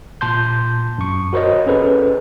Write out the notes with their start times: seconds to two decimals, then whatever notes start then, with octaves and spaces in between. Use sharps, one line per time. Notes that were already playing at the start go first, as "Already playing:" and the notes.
0.21 A#2 A5 C6 G6
0.98 F#2 C#6
1.33 F#4 A#4 C5 C#5 D#5
1.66 C#4 G#4 A4 B4 C5